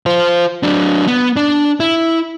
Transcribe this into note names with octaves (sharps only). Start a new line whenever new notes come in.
F4 C5
F#3 D4
B3
D4
E4